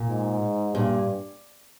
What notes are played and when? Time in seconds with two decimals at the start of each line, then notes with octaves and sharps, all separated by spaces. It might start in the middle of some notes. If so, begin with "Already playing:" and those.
Already playing: A#2
0.09 G#2
0.75 G2 A#2